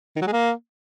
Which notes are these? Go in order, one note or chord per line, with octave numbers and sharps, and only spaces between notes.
D#3
F#3
G#3
A#3